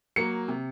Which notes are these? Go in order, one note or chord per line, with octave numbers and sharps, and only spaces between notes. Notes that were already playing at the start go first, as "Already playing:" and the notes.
F#3 A#3 C#7
C3